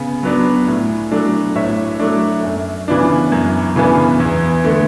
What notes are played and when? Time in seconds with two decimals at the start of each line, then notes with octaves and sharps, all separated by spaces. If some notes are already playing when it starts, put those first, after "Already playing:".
Already playing: C#3 B3
0.23 F#3 B3 D4
0.68 A2
1.12 F#3 A3 D4
1.55 A2 C#5 E5
2.00 F#3 A3 D4
2.43 F#2
2.88 C#3 E3 B3 D4
3.32 F#2
3.76 C#3 E3 B3 D4
4.20 E2
4.64 D3 A3